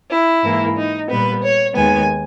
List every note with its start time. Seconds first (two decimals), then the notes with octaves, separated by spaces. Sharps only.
0.09 E4
0.42 G#2 E3 A#3
0.75 D#4
1.08 A#2 G3 B3 B4
1.42 C#5
1.75 D#2 D#3 G#3 B3 G#5